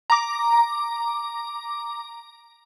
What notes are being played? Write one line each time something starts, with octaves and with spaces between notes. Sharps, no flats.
A#5 D6